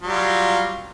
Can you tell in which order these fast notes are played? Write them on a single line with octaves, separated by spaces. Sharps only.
F#3 G3 F4